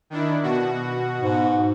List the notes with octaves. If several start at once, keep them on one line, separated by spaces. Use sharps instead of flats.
D#3 D4 E4
B2 F#4
G#2